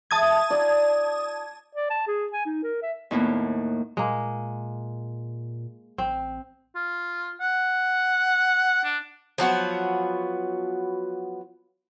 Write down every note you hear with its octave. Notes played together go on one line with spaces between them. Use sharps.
E3 G#3 E5 A5 D#6 G#6
D#4 F4 D5
D5
A5
G#4
G#5
D#4
A#4
E5
D#2 A2 A#3 B3
A#2 G#3 A#3
A1 C4
F4
F#5
D4
F3 F#3 B3 F#4